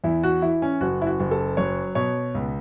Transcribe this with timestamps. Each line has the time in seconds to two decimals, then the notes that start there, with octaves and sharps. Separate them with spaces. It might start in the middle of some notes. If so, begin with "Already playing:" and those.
0.04 E2 E4
0.23 F#4
0.42 E3 E4
0.62 C#4
0.81 F#1 F#4
1.02 E4
1.07 F#4
1.20 F#1
1.31 A4
1.57 F#3 C#5
1.95 B2 C#5
2.35 C#2